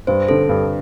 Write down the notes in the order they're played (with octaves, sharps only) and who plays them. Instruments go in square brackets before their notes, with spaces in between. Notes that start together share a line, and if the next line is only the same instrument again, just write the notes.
[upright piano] G2 [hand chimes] C5
[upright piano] D3 C4 [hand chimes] A4
[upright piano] G2